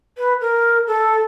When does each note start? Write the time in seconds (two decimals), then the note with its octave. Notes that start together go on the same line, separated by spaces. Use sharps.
0.18 B4
0.41 A#4
0.87 A4